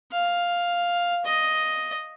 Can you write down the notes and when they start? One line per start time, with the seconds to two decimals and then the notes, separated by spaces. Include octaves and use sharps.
0.12 F5
1.25 D#5